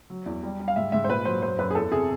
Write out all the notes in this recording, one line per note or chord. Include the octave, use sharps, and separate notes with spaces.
F#3
E2
G3
G3
F5
G#2 E5
G#2 E5
C5
A#2 B4
F#3 C5
F#2 C5
F#2 B4
G#4
E2 A4
C3 G#4